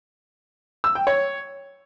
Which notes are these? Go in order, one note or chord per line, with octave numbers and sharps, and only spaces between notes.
E6
G5
C#5